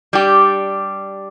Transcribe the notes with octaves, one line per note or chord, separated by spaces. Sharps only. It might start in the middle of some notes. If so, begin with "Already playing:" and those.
G3 D4 G4